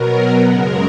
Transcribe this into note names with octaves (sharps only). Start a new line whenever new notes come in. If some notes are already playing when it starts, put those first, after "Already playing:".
Already playing: B2 F#3 B3 A#4
F#2 C#3 G#3 A#4